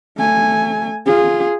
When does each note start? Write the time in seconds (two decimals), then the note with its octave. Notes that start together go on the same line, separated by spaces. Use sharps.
0.18 A3 G#5
1.06 F4 G#4